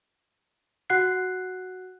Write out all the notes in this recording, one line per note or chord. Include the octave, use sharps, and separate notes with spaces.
F#4 F#5 F#6 C7